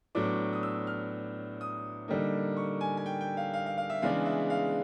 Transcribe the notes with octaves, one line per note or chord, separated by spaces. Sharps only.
A2 F#3 B3 D4 D6
D#6
E6
F6
D#6
D3 G3 A#3 D#4
C#6
G#5
G#5
G5
G5
F5
F5
F5
F5
E5
C#3 E3 G#3 B3 D4 F5
E5
F5